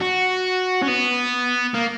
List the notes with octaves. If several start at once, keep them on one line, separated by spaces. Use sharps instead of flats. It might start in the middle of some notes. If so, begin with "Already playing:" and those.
F#4
C#4
B3
A#3